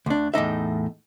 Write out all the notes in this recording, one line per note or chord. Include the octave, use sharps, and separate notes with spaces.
D2 D4
E2 A2 D#4 E5